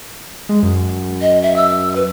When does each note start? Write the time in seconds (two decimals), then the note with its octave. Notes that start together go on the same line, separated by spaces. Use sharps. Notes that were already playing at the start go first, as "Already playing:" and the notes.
0.49 G#3
0.63 F#2
1.22 D#5
1.42 E5
1.56 E6
1.96 B4